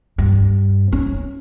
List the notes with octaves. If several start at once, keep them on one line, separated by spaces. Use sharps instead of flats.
G2
C#4